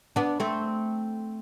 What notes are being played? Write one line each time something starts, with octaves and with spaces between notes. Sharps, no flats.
B3 D4
A3 C4